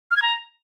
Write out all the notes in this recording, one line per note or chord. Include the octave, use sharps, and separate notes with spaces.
F6
G#6
A#5